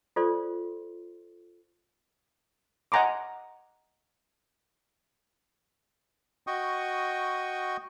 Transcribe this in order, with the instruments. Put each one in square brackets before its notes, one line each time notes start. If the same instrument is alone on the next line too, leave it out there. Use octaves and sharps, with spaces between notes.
[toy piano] F4 A4 C5 D5 C6
[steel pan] D#5 F#5 G#5 A#5 C6 D6
[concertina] F#4 D#5 G5 C#6 D#6